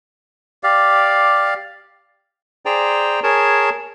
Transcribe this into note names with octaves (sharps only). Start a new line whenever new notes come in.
G4 D5 F5
G#4 C5 D5 G5 A#5
G#4 A#4 C#5 A5